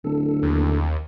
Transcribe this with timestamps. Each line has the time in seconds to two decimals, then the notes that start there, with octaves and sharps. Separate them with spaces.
0.04 D1 D3 A4
0.43 D#2